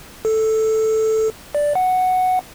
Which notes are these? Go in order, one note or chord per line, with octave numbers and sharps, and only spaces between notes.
A4
D5
F#5